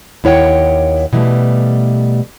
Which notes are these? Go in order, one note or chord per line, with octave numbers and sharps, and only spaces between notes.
D#2 E4 C#5 F#5 G5
B2 E3 G3 A3